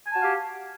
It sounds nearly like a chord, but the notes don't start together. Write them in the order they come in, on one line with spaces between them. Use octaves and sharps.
G#5 A5 F#4 F5 G4